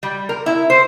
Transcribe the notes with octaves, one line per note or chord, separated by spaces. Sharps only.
G3
A#4
E4
C5